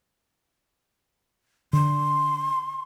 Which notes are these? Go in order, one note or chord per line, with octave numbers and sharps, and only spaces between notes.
D3 C6